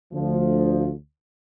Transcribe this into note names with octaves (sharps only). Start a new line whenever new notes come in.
D2 F3